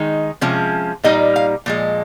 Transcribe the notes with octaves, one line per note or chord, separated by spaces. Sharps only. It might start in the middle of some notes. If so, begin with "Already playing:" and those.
Already playing: D#3 G#3 D#4
C3 F3 G#3 C#4
A#2 G3 A#3 D#4 D#5
F5
A#2 F3 G#3